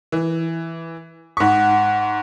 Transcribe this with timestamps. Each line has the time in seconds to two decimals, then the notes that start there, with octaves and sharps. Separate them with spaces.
0.12 E3
1.37 G#2 F#5 C#6 B6